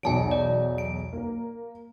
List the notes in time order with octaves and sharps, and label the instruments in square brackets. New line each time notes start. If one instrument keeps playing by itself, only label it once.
[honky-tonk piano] B1 E2 F#3 [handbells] G#5 A5 D7
[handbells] D5
D7
[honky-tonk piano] A#3 A#4